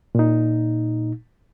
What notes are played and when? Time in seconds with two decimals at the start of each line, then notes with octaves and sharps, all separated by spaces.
0.15 A#2 D#4